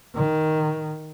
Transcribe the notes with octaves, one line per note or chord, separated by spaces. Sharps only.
D#3